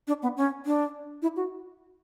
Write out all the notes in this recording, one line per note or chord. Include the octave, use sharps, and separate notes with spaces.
D4
B3
C#4
D4
E4
F#4